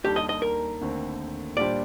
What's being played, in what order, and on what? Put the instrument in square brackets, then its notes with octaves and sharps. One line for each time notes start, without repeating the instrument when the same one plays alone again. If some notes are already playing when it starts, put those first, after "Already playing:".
[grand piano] D#2 D#3 G3 D4 A4 [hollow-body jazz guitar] G4
[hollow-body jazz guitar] D#5
D#5
A#4
[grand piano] D#2 D3 A3 C4
[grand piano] A#2 G3 D4 G4 C5 [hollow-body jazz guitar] D5